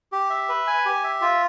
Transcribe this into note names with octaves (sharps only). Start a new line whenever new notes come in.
G4
E5
B4
G#5
G4
E5
F4